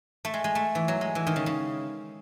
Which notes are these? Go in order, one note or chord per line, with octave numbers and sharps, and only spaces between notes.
A3
G#3
G#3
A3
E3
F#3
G#3
E3
D#3
C#3
C#3